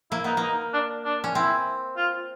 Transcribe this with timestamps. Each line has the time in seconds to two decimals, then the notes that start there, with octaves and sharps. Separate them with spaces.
0.11 A#3 E4
0.24 B3 D#4
0.37 A#3 D#4
0.74 D4
1.05 D4
1.24 C#4
1.35 C4 E4
1.97 F4